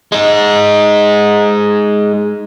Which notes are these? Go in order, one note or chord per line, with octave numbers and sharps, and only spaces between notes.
G#3 D#4